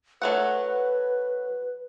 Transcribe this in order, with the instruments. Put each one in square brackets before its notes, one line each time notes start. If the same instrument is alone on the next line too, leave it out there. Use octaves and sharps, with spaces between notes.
[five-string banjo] F#3 A3 F#5 [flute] B4